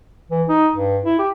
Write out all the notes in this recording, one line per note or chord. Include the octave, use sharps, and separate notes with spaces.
E3
D#4
G2
E4
G4